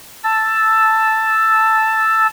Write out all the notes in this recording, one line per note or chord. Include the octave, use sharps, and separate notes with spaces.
A5 E6